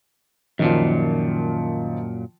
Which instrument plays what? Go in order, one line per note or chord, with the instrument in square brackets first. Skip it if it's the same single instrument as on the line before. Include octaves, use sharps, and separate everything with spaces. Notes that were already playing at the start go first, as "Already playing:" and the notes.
[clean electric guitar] F#2 A#2 [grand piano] D#3 F3